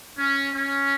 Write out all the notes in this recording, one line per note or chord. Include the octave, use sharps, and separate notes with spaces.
C#4
C#4